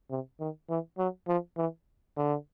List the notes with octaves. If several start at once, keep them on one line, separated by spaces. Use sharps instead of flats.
C3
D#3
E3
F#3
F3
E3
D3